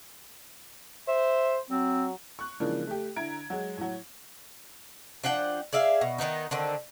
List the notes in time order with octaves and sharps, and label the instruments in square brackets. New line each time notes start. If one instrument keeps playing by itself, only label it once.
[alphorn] C5 [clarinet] E5
[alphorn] F#3 [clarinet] C4
[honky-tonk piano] C#6 F#6
C#3 E3 F3 G#3 A#3 D4
A3 G4
D3 E4 A#5 G#6 D7
F#3 G#3
A2 F#3
[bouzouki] F3 D4 F#5 G5
G#4 D5 E5 F5
B2
D#3 E3 B3 D#4
D3 D#3 C4